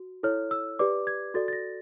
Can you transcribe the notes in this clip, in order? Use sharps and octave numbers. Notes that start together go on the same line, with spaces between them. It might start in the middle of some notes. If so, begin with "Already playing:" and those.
Already playing: F#4
E4 A4 C#5 F6
E6
G4 B4 D5 D6
G#6
F#4 A4 D5 A6
A6
A#6